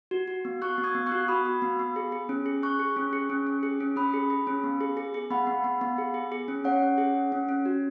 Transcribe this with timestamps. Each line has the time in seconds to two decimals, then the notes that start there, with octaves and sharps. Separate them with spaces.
0.11 F#4
0.28 F#4
0.45 B3
0.62 F#4 C#6 F#6
0.78 B3
0.84 D#6 G#6
0.95 B3
1.06 C#6 F#6
1.12 F#4
1.28 F#4 B5 D#6
1.45 F#4
1.62 B3
1.79 B3
1.96 G#4
2.12 G#4
2.29 C#4
2.46 G#4
2.63 G#4 C#6 F#6
2.79 G#4
2.96 C#4
3.13 G#4
3.30 C#4
3.47 C#4
3.63 G#4
3.80 C#4
3.96 C#4 B5 D#6
4.14 G#4
4.30 G#4
4.47 C#4
4.64 B3
4.81 G#4
4.97 G#4
5.14 G#4
5.31 B3 F#5 B5
5.47 B3
5.64 B3
5.81 B3
5.98 G#4
6.14 G#4
6.32 G#4
6.48 C#4
6.64 C#4 C#5 F#5
6.82 C#4
6.98 G#4
7.15 C#4
7.32 C#4
7.49 C#4
7.66 F#4